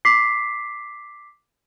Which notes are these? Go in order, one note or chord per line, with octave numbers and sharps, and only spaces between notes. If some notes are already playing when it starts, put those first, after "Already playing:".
D6 B6 C7